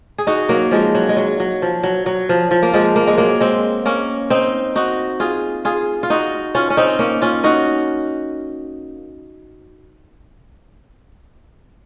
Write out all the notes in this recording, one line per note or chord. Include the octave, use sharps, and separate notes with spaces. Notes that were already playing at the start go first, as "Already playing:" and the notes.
G#4
D#4 F#4
F#3 A#3
F3 G#3
F#3
G#3
F#3
F#3
F3
F#3
F#3
F3
F3
A#3
F3 G#3
A#3
G#3
F#3 A#3
G#3 C4
A#3 C#4
C4 D#4
D#4 F#4
F4 G#4
F4 G#4
F4
D#4 F#4
C#4 F4
C#4
C4 D#4
A#3 C#4
C#4 F4
D#4 F#4